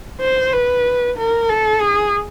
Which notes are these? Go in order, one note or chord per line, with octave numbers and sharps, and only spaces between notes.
C5
B4
A#4
A4
G#4